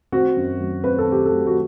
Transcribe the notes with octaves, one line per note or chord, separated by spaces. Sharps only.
C4 F#4
F#2
F#3
C4 B4
A4
C4 G4
A4
F#3
F#4